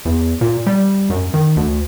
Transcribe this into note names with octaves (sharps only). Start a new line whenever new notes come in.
E2
A#2
G3
F#2
D#3
D2